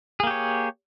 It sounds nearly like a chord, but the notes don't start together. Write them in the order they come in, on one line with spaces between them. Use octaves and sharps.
G#4 A#3 G4 C#5